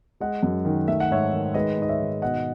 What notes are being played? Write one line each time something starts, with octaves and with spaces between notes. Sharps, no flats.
G#3 D#5 F#5
F#2
D#3
A3 E5
F#5
G#2 C#5 E5
D#3
G#3 B4 D#5
G#2 D#5
C#5 E5
D#3
B2 D#5 F#5